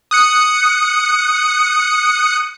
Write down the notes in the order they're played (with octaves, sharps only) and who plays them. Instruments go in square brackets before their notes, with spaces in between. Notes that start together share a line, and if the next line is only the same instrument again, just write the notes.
[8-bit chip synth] D#6 F#6 C#7